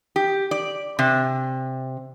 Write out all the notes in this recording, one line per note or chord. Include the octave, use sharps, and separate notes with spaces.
G4
D5
C3